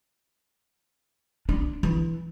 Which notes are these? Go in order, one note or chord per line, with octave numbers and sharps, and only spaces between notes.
D4
E3